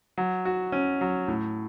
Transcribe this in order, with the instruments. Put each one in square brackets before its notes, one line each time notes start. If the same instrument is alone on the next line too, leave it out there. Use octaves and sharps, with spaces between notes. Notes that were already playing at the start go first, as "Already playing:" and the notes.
[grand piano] F#3
F#4
C#4
F#3
A2